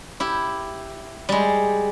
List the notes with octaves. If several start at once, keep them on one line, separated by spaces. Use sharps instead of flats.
E4 G4
G3 G#3